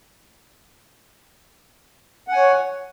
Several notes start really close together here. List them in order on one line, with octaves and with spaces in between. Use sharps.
F#5 G#5 C#5